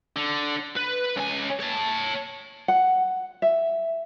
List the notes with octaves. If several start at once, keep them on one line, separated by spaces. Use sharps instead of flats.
D3
B4
C#2 G#5
C#5 A5
F#5
E5